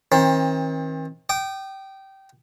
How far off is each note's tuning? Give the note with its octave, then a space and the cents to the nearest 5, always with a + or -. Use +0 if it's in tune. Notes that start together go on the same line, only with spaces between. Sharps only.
D#3 +40 C4 +40
G5 -20 D#6 -45